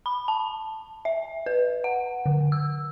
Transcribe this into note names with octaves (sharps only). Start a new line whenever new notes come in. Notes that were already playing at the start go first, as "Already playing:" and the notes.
B5
A5
E5
B4
F#5
D3
E6